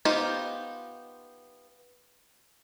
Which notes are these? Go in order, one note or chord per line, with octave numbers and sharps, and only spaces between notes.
B3 D#4 F4 G4 C5